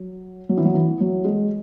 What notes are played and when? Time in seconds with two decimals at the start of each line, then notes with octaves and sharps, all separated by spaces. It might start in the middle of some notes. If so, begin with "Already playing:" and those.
Already playing: F#3
0.49 F#3
0.57 E3
0.65 F#3
0.74 E3
1.00 F#3
1.25 G#3